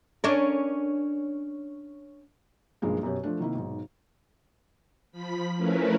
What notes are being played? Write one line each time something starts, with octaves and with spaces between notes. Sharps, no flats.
C#4 D4 A#4
B1 G2 F3 G#3 A#3
F#2 B2 G4 C#5
F3 A3 D4
C3 D#3 A#3 E4
B1 G#2
F3 B5 B6
F3 A3 C#4 E4 A#4 B4